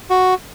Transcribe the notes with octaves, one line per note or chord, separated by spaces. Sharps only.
F#4